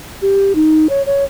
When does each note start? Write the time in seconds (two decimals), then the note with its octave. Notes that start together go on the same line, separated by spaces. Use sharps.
0.22 G4
0.55 D#4
0.89 C#5
1.06 C#5